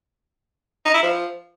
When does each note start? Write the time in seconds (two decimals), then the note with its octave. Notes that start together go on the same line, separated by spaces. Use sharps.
0.85 D#4
0.94 E4
1.03 F3